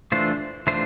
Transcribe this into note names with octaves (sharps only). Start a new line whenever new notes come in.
E3 A3 D4 F4 C5
E3 A3 D4 F4 C5